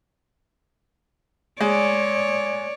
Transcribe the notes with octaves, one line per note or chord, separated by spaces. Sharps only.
G#3 C#5 D5